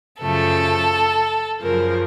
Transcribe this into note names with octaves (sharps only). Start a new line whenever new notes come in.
F#2 C#3 F3 A3 A4
F#2 C#3 F3 A#4